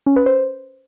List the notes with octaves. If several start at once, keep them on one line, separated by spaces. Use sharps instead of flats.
C#4
B4
C5